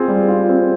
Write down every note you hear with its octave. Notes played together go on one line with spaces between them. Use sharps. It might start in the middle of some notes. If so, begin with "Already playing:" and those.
Already playing: C4 F4 G#4
G3
F4
C4